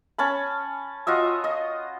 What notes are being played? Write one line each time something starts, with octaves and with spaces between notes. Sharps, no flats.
C#4 A5 B5
F4 F#4 D#5 E5
D#5